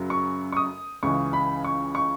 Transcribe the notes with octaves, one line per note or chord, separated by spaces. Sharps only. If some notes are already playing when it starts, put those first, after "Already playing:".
Already playing: F#2 C#3 F#3
C#6
C#6
D#6
C#2 C#3 E3 C#6
B5
C#6
C#6